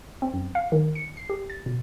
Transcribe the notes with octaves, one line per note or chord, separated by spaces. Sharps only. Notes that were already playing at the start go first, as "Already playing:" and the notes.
C4
F#2
F5
D#3
C#7
C7
G4
A6
B2